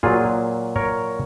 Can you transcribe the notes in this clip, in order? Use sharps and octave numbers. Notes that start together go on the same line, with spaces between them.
A#2 F#3 F4 G#4
A#4 C#5